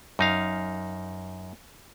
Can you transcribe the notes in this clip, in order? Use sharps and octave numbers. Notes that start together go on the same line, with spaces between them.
F#2 D#4 F5